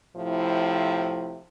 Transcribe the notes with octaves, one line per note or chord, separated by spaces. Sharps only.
A2 C3 F3 E4